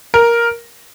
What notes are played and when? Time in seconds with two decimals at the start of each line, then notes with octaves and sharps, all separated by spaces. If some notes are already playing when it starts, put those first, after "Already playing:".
0.14 A#4